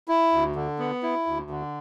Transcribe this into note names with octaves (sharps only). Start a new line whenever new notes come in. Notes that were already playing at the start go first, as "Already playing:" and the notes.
E4
D2
D3
B3
E4
D2
D3